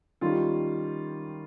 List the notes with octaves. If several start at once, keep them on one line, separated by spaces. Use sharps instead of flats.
D#3 G3 C#4 F4